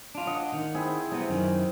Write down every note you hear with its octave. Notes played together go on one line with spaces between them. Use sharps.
D4 F4
D#5 F#5
D#3
C4 E4 G#4
C3 G3 B3
F#2 D#3